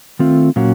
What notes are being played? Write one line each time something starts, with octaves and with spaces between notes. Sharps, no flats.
D#3 A3 C4 F4
A#2 F#3 A#3 C#4 F#4